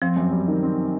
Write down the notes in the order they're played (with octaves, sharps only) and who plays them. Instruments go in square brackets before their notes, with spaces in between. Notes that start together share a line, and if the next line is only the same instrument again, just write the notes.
[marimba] F3 [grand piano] C4
[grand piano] F#2
G3
D#3
C4